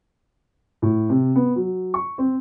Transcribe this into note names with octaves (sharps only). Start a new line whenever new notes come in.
A2
C3
B3
F#3
C#6
C4